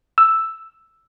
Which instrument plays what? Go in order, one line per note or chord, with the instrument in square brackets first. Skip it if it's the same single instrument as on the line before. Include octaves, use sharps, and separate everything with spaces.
[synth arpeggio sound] E6